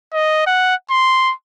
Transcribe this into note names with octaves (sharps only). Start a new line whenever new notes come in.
D#5
F#5
C6